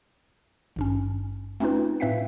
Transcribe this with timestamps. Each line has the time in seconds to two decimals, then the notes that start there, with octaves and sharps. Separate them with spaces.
0.76 G#1 G2 C#4
1.60 A3 C4 C#4 D#4 F4 B4
2.00 A2 C4 B4 E5 F5 B6